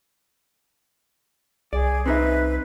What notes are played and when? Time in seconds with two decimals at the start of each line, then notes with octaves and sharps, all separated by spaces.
1.73 C2 G#4 D5
2.06 C4 D#4 B4 E5